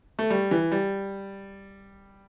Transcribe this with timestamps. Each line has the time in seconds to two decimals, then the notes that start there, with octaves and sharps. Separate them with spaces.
0.19 A3
0.30 G3
0.51 E3
0.72 G3